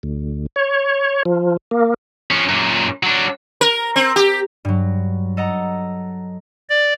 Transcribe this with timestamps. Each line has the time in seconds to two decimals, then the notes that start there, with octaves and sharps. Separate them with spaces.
0.03 D2
0.56 C#5
1.25 F3
1.71 A#3
2.31 F3 C#4
2.49 F#2 A#2
3.03 F#3 D4
3.61 A#4
3.96 C4
4.16 G4
4.65 G2 F#3
5.37 A4 D#5 F#5 A#5
6.69 D5